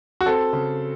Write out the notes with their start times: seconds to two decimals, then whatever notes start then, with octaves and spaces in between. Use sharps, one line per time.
0.21 F#4
0.26 C4 A4
0.53 C#3